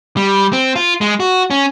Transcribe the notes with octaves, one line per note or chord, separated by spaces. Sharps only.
G3
C4
F4
G#3
F#4
C#4